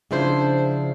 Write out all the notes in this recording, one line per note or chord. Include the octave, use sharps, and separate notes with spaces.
C#3 F3 D4 E4 C5